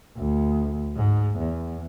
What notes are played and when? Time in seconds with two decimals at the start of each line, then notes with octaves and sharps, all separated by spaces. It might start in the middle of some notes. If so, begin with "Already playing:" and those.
0.17 D2
0.96 G#2
1.39 E2